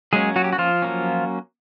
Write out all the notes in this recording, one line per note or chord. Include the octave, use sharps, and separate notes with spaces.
F#3 G#3 A#3 C#4 G#4
F#3 F#4
G4
F#4
F3 F4
F#3 A#3 C#4